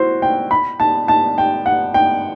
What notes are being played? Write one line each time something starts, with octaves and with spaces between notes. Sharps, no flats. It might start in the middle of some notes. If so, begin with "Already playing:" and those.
Already playing: E4 F#4 C5
G5
B5
A5
A5
G5
F#5
G5